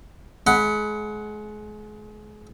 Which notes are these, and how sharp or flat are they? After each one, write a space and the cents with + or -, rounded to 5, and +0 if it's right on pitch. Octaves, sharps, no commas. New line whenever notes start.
G#3 +30 F#5 +0 B5 +0